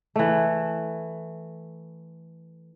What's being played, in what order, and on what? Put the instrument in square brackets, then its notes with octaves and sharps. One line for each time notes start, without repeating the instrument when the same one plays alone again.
[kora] E3 A3